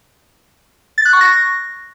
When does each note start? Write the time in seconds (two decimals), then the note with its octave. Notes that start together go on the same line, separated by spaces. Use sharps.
0.98 A6
1.05 F#6
1.13 C#6
1.21 A#6